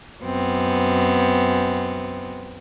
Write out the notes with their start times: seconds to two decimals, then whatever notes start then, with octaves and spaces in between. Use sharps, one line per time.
0.24 F#2 B3 C4